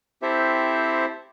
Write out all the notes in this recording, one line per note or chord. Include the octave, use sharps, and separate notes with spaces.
C4 E4 G4 A4 C5 E5